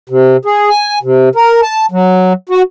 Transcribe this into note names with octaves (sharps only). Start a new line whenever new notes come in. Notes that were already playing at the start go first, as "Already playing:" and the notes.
C3
G#4
G#5
C3
A#4
A5
F#3
F#4